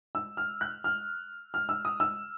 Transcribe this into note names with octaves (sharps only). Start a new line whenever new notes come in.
E6
F6
F#6
F6
F6
E6
D#6
E6